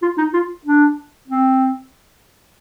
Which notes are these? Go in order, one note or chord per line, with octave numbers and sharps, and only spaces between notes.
F4
D#4
F4
D4
C4